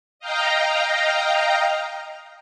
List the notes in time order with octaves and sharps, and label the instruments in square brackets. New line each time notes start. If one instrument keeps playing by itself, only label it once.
[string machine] D#5 F5 G5 A#5